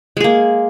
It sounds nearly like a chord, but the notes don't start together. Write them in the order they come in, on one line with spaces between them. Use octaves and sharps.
G#3 G#4 A#3